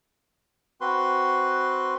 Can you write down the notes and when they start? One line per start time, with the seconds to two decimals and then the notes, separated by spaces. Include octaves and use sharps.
0.81 C4 F#4 B4 C6